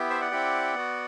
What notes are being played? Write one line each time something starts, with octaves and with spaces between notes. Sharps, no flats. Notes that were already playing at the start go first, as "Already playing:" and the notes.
Already playing: B3 E4 G4
C5 E5
D5 F#5
C4 E4 G4
B3 F#4